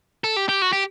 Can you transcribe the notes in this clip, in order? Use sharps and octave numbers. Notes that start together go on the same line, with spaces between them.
A4
G4
G4
F#4
G4